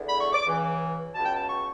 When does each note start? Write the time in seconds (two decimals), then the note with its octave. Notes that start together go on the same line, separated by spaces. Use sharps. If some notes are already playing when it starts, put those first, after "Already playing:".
Already playing: E2 D3
0.09 B5
0.21 C#6
0.33 D6
0.45 C#2 C#3 E3
1.15 C#2 B2 A5
1.25 G5
1.36 A5
1.50 C#6